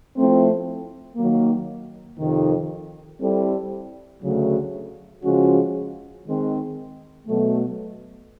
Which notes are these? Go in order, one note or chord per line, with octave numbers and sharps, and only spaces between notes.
F3 A3 C4 E4
D#3 F#3 A#3
F2 C3 D#3
G3 C4 E4 A4
D2 C#3 F#3 A3
C#3 F3 G#3 C#4 F#4
D#3 G#3 C4
B2 F#3 A3